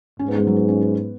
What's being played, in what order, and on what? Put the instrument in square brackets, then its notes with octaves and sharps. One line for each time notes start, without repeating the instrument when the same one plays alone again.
[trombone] G#2 [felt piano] C#4
[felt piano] B3
G#3
F#3
B3
C#4
B3